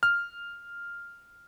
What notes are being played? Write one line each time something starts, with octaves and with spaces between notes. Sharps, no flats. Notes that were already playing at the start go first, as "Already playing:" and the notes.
F6